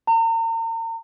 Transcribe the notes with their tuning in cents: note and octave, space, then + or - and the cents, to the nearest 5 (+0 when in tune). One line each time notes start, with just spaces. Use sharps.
A#5 -40